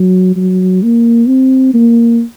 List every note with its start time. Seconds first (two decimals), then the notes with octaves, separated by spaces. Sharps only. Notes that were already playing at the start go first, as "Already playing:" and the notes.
Already playing: F#3
0.36 F#3
0.83 A#3
1.27 C4
1.74 A#3